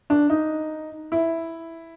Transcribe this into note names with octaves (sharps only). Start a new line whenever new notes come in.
D4
D#4
E4